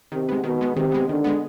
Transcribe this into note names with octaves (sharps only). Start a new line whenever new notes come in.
C3 D#3
G#3 B3
B2 D#3
G#3 B3
C3 D#3
G#3 B3
D3 D#3
G#3 B3